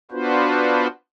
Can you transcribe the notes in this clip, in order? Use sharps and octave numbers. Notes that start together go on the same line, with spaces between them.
B3 D4 F4 F#4 B4 C5